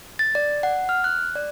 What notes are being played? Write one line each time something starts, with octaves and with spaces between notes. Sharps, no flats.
A6
D5
F#5
F6
F#6
D5